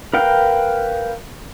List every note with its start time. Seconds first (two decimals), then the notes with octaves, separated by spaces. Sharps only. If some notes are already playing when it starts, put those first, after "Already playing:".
0.13 A#4 B4 F5 G5 F6